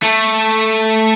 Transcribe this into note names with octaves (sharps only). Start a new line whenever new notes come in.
A3